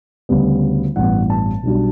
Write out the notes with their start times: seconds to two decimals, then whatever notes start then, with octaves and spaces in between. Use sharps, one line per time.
0.29 D2 C#3 G3 B3
0.96 A1 G2 E3 B3 F#5
1.30 A5
1.63 B1 B2 G3 D4